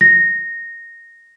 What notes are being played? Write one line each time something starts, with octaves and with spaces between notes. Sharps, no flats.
A#6